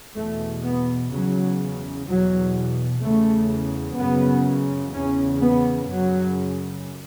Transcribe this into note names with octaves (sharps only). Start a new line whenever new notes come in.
E2 B2 A3
B3
E2 C#3 F#3
E2 B2 F#3
E2 C#3 A3
F#2 C#3 B3
E2 C#3 C#4
B3
F#2 C#3 F#3